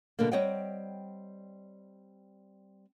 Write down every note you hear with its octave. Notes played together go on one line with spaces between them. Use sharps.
B2 D3 G3 A#3
G3 C4 C#5 D#5 F#5 G5